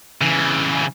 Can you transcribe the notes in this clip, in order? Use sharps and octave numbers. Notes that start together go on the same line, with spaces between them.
C#3 E3